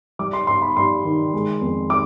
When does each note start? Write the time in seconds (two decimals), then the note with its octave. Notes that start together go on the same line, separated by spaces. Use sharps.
0.19 G3 D6
0.33 C6
0.47 G2 C6
0.62 B5
0.76 G2 C6
1.05 D#3
1.33 G#3
1.62 F2
1.90 D6